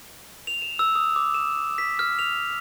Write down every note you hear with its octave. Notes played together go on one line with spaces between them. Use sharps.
F7
E7
E6
D#6
D6
E7
B6
F6
F7